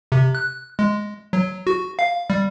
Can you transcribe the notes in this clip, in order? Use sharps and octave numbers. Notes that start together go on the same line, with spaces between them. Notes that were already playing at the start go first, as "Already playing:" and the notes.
C3
F#6
G#3
F#3
F#4
F5
G3